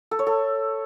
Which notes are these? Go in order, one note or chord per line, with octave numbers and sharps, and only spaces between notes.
A4
C#5
A4